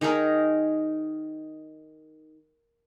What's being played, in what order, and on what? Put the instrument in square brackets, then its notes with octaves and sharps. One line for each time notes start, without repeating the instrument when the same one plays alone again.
[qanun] D#3 D#4 G#4 A#4